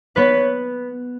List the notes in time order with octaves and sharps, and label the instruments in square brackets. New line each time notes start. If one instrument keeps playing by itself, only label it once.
[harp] B3 B4 [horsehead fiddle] C#5